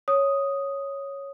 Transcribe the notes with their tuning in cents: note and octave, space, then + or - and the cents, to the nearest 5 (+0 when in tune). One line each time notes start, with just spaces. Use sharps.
C#5 +0 D#6 +0